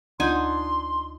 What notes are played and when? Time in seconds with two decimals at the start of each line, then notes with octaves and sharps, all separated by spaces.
0.20 D2 D4 D#4 F4 G#5 C6 G6